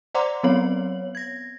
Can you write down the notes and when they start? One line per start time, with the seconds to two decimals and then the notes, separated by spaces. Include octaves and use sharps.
0.15 C5 D5 F#5 A#5 C6 D6
0.43 F#3 B3 C4 C#5 F#7
1.15 G#6 A#6